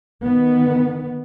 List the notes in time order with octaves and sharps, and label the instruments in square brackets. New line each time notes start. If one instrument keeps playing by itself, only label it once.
[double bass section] D#3 B3